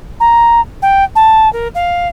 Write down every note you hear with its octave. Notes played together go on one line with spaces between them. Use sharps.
A#5
G5
A5
A#4
F5